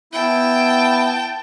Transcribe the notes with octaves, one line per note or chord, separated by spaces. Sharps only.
B3 E4 G5 A5